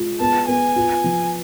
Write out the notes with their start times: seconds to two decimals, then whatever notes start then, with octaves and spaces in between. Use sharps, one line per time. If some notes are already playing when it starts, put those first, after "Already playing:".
Already playing: G#3 F4
0.20 B3 A5
0.48 B3 G#5
0.76 F4
1.04 F3